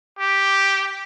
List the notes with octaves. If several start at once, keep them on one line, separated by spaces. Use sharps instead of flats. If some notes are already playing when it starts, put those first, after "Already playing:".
G4